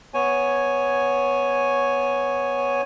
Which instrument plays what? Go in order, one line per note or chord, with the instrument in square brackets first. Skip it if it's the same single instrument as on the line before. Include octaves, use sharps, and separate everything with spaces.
[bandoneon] B3 C#5 G#5